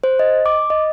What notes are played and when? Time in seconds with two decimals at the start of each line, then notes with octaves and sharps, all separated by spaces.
0.04 C5
0.19 D#5
0.46 D6
0.70 D#5